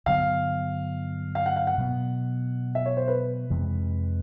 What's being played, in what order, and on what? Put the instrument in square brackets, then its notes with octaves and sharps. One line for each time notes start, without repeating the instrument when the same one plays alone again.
[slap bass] G2 D3 F#3 B3 [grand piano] F5
[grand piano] F5
F#5
F5
F#5
[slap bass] B2 F#3 B3
[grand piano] E5
C#5
C5
B4
[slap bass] F2 C3 E3 G#3